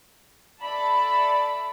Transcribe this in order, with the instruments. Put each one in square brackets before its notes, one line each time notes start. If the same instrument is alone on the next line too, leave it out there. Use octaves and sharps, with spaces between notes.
[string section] A4 D5 E5 A5 B5